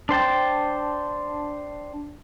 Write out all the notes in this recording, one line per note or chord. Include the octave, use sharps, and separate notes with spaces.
D4 C5 G5 A5